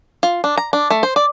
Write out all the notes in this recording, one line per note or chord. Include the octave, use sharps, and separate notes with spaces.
F4
D4
A#5
D4
A3
C5
D5